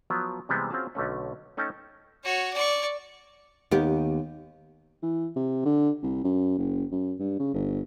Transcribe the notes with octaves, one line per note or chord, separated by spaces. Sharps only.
F3 F#3 B3
C3 E3 G3 G#3 B3 C4
C4 C#4 F4 F#4 G#4 A5
B1 D3 A3 C#4
A3 C#4 D#4 A4 G5 A5
F#4 C#5
D5 C#6
D#2 B3 G4
E3
C3
D3
C2
F#2
F#1
F#2
G2
C#3
G1